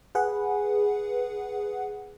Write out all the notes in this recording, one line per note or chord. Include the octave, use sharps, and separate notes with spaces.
G#4 B4 F#5